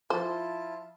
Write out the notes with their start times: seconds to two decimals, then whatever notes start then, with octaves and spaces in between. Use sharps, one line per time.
0.10 F3 E4 F4 C5 A5